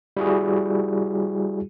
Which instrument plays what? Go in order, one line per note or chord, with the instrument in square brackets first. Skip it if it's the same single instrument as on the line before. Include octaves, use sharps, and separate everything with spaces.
[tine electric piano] G3 E4 F#4 G#4